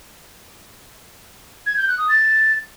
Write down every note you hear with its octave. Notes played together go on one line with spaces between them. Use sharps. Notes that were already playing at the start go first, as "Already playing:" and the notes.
G#6
G6
F#6
D#6
A6